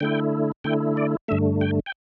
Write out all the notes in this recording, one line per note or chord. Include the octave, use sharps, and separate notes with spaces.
D3 A3 E4 G5
D3 A3 E4 G5
D5
G2 D3 A3 E5
G5
G5